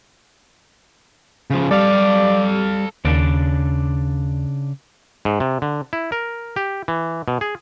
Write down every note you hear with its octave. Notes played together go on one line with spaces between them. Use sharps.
C#3 F3
G3 A4 D5 F5
D#2 C#3 D4 D5
G#2
C3
D3
E4
A#4
G4
E3
B2
G#4